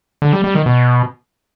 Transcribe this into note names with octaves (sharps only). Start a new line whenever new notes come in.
D3
G3
G3
D#3
B2